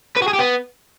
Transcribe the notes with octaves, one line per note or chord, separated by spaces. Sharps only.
B4
F#4
G#4
G4
B3